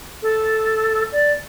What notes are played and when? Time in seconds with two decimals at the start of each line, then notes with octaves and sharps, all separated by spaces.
0.22 A4
1.12 D5